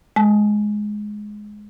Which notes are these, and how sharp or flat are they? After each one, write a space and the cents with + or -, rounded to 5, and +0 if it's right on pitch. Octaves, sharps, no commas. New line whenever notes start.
G#3 +10 A5 -20